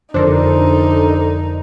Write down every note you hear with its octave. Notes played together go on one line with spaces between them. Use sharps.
F1 F2 D3 D4 D#4 A4 A#4 C5